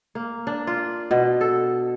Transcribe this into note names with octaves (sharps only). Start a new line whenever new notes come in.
A#3
D4
F4
B2
A4